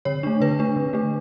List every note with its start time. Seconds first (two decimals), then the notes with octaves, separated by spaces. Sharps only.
0.05 D3 C#5
0.23 A3 D4
0.40 D3 B4
0.59 A3 D4
0.76 D3
0.93 A3 D4